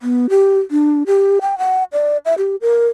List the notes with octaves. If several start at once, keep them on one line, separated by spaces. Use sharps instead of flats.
B3
G4
D4
G4
G5
F#5
D5
E5
G4
A#4